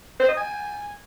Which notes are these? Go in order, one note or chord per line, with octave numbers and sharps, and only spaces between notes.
C5
D#5
G#5